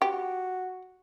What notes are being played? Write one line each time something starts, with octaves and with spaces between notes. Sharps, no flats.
F#4 G4